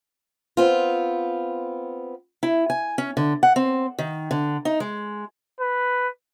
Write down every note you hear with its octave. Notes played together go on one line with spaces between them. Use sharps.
B3 C4 F4
E4
G#5
C#4
D3
F#5
C4
D#3
D3
D#4
G#3
B4